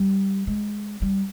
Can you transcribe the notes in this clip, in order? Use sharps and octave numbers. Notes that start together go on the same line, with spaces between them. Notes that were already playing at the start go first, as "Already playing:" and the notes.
Already playing: G3
G#3
G3